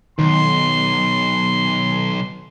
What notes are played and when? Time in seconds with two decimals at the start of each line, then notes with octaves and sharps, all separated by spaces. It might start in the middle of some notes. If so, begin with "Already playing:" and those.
0.19 B1 D#3 C6